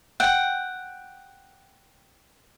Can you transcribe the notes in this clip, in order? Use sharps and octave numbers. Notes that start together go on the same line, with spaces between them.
F#5 G5